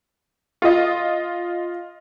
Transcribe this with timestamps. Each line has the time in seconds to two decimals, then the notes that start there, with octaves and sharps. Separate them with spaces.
0.62 F4 D#5